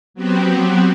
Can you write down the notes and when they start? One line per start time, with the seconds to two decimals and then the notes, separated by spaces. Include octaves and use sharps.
0.14 F#3 B3 C4 F#4 G4